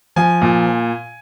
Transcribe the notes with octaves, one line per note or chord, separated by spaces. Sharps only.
F3 G#5
A#2